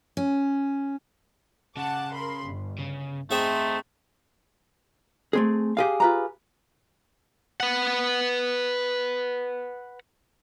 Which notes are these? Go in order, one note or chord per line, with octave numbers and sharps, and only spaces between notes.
C#4
C#3 F#5 A5 D6
A#4 B5 C6
G1
C#3
A3 C4 D#4 G#4 A4 C5 E5
A3 C4 G#4
G4 G#4 F5
F4 B4 A#5
B4 F#5